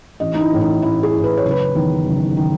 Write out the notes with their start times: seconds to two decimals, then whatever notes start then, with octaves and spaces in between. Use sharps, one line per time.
0.20 A1 D#5
0.34 D#4
0.40 E4
0.52 A2 E3
0.61 D#4
0.82 A1 E4
1.03 G#4
1.13 A2 E3
1.24 B4
1.37 C#5
1.45 F#1
1.51 B4
1.75 E2 D#3
2.06 F#1
2.37 D#3